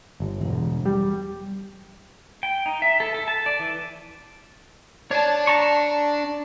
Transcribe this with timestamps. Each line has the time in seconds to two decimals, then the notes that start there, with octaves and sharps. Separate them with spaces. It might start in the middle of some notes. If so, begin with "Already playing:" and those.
0.20 G1
0.41 E1
0.86 G3
2.43 G5
2.66 D#4
2.82 E5
3.00 A4
3.14 A4
3.28 A5
3.46 D5
3.59 E3
5.11 D4 C#5 A5
5.47 A5 A#5 C#6